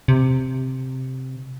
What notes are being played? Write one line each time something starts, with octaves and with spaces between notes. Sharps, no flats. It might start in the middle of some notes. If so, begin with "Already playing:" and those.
C3